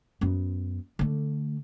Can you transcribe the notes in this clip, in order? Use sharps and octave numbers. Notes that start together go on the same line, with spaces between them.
F#2 B3
D3 A3